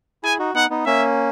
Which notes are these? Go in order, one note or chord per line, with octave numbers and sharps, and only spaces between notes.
E4 G#4 G#5
D#4 F#4
B3 D#4 F#5
B3 D#4
A#3 C#4 E5